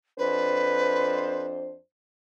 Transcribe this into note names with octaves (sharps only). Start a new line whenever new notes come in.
F2 D4 B4 C5